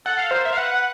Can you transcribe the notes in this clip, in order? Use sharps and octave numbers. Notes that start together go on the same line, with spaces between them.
A4 F#5
F5
A#4 C5
E5
F5
B4 F#5